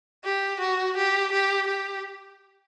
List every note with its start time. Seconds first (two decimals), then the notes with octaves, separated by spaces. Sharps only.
0.24 G4
0.61 F#4
0.97 G4
1.33 G4
1.67 G4